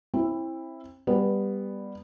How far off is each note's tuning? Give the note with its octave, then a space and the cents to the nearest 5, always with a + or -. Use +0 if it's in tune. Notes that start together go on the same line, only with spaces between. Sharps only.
C4 +30 E4 +0
G3 +15 B3 +0